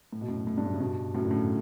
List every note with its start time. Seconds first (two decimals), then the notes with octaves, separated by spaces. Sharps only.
0.13 A2
0.21 B2
0.28 F#2 A2
0.47 A2
0.57 G2
0.66 F#2 A2
0.74 C#3
0.80 G2 B2
1.14 F#2 A2
1.25 D3
1.31 A2 C#3